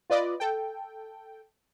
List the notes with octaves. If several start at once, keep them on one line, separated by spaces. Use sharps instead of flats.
F4 B4 D5 D#5
A4 G5